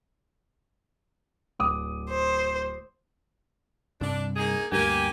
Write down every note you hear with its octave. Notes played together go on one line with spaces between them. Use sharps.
D1 D6 D#6
C5
C2 G2 D4
A#3 D#4 G#4
D2 G2 A#3 G4 G#5